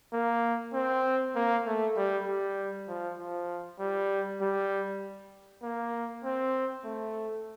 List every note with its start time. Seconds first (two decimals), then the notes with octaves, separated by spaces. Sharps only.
0.13 A#3
0.74 C4
1.35 A#3
1.66 A3
1.96 G3
2.27 G3
2.88 F3
3.19 F3
3.79 G3
4.41 G3
5.63 A#3
6.24 C4
6.85 A3